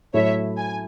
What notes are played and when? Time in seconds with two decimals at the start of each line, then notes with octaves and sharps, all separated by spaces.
0.14 A2 F#3 A3 E4 C#5 E5
0.57 G#5